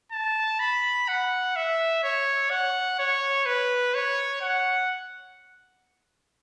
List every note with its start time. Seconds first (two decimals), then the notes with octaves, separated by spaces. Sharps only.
0.12 A5
0.60 B5
1.08 F#5
1.56 E5
2.03 C#5
2.50 F#5
2.99 C#5
3.46 B4
3.95 C#5
4.41 F#5